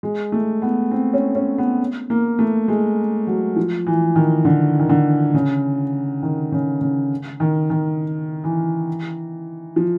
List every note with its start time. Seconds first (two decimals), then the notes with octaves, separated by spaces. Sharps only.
0.03 G#3
0.32 A3
0.62 B3
0.91 C4
1.14 C#4
1.35 C#4
1.58 B3
2.10 A#3
2.39 A3
2.68 G#3
3.27 F#3
3.56 F3
3.87 E3
4.16 D#3
4.45 D3
4.80 D#3
4.89 D3
5.34 C#3
6.23 D#3
6.52 C#3
6.81 C#3
7.40 D#3
7.70 D#3
8.44 E3
9.76 F3